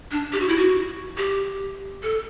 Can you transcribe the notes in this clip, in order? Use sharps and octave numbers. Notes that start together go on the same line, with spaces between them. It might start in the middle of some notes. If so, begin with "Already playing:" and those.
D4
G4
F#4
E4
F#4
G4
A4